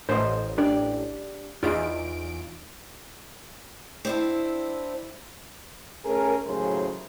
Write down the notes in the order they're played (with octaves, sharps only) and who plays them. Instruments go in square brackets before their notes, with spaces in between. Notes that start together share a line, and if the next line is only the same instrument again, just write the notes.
[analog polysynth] A1 [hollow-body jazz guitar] C5 D#5
[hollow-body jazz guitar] D4 G4 D5
[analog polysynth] E2 D7 [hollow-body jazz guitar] D#4 F4
[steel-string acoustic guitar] C4 D4 E4
[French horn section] A3 C#4 G#4 A#4
D#2 A2 C#3 F#3 G#4 C5